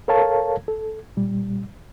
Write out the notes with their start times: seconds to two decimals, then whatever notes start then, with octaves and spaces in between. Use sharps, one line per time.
0.08 A4 A#4 C#5 F5 A5
0.68 A4
1.17 A#2 G3